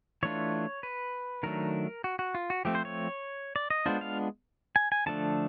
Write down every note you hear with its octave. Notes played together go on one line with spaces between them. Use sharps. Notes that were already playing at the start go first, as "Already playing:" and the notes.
E3 A3 D4 F4 C#5
B4
D#3 F#3 A3 D4 A#4
F#4
F#4
F4
F#4
F3 A3 C4 G4
C5
C#5
D5
D#5
G#3 B3 D4 F4 C5
F5
G#5
G#5
D3 F3 A3 D4 A5